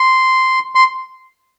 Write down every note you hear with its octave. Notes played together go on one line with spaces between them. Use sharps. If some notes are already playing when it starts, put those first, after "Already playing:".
Already playing: C6
C6